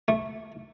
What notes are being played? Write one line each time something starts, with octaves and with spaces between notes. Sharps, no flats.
A3